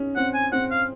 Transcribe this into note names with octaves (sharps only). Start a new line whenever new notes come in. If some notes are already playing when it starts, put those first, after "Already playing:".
Already playing: C#4 D#4
C4 F#5
G#5
C4 F#5
F5